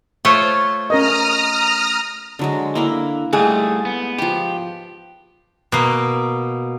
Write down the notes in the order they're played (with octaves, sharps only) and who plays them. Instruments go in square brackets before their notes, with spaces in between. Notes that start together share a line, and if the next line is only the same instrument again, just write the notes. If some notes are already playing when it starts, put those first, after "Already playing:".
[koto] A3 F4 C5 [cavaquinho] C#5
[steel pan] C#4 A#4 D#5 [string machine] A#5 D#6 F6
[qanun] D3 F#3 G#3
[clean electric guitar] D3 [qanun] A#3 E4 A#4
[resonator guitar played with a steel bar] G#2 G#4 [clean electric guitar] G3 A3
[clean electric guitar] B3
[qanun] F3 B4 [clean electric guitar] G4
[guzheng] B2 A#3